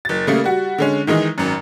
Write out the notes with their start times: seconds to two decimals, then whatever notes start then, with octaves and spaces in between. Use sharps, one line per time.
0.05 F#1 A6
0.27 C#3 G3 A3 A#3
0.44 G3 F#4
0.78 D3 G#3 C#4
1.07 D#3 E3 G#3 D#4
1.38 G#1 F#2